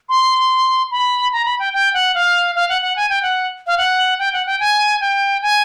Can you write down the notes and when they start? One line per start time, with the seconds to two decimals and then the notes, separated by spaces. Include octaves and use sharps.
0.09 C6
0.91 B5
1.33 A#5
1.45 B5
1.59 G5
1.73 G5
1.94 F#5
2.15 F5
2.55 F5
2.69 F#5
2.82 F#5
2.96 G#5
3.10 G5
3.23 F#5
3.67 F5
3.78 F#5
4.19 G5
4.33 F#5
4.46 G5
4.60 G#5
5.01 G5
5.42 G#5